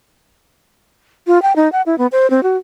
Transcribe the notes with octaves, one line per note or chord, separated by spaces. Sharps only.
F4
G5
D#4
F#5
E4
B3
C5
C4
F#4